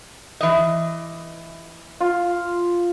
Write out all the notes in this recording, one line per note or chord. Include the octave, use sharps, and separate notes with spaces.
E3 D#5
F4